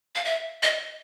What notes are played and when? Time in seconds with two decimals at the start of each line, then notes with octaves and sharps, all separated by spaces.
0.15 F5
0.25 E5
0.63 D#5